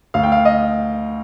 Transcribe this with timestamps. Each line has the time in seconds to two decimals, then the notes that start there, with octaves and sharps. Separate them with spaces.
0.14 D2 F5
0.23 G5
0.32 F5
0.45 D#5